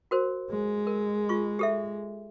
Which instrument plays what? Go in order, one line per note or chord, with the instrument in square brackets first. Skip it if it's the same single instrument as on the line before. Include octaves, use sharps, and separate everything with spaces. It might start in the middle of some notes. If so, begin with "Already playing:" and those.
[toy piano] F#4 A#4 C5
[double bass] G#3
[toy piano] A#4
F4 C#6
G4 A4 E5